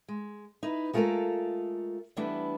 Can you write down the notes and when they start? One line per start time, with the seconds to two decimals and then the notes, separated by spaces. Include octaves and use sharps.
0.08 G#3
0.63 D#4 E4 B4
0.93 G#3 A3 F4 F#4 A4 A#4
2.17 E3 G3 A3 B3 D4 E4